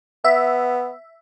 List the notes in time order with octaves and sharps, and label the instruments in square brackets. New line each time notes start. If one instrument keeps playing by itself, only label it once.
[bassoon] B3 [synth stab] E5